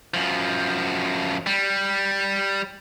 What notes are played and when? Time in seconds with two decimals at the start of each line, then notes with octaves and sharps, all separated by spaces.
0.14 F#2 F3
1.46 G3